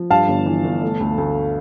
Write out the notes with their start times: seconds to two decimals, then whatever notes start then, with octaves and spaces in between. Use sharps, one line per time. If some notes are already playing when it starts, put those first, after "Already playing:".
Already playing: F3
0.10 G2 F5 A5
0.28 G1
0.46 E3
0.64 G1
0.82 A3
1.00 D2
1.18 D2